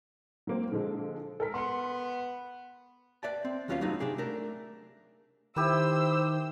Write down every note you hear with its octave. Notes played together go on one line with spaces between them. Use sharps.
F#3 A#3 C4
D3 F3 G#3
A4 A#4 B6
B3 C6 C#7
B4 D5 E5 G5 A5
C4
D#2 F#3 C#4 F4 B4 F5
F#3 G3 A3 C4 D#4 F4
C3 D4 G4 G#4
A3 D4 A#4
D#3 E4 G4 B4 C5 E6